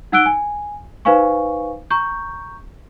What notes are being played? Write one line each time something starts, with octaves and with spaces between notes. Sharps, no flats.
D#4 F#5 E6 F#6 D7 G7
G#5
D#4 B4 C5 F5 G#5 C#6
A#5 C#6 G6